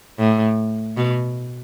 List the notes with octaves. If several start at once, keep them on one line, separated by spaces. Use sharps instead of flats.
A2
B2